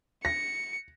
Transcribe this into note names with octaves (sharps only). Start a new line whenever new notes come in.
A#6 C#7